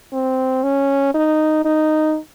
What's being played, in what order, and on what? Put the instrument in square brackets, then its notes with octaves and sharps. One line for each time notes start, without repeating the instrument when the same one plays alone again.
[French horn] C4
C#4
D#4
D#4